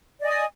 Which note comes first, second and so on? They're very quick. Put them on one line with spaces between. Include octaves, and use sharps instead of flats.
D5 D#5 G#5 D#6